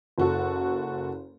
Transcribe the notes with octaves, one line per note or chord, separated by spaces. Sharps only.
F#1 F#4 A4